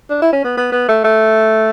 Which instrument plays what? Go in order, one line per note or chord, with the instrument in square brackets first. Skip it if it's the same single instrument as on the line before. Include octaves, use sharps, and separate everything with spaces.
[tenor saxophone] D4
E4
C#4
B3
B3
B3
A3
A3